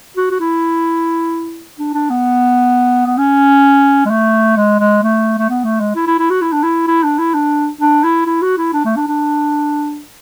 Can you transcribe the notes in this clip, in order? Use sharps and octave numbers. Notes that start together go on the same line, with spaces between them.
F#4
F#4
E4
D4
D4
B3
B3
C#4
G#3
A3
G#3
G#3
A3
A3
B3
A3
G#3
E4
E4
E4
F#4
E4
D4
E4
E4
D4
E4
D4
D4
E4
E4
F#4
E4
D4
A3
D4
D4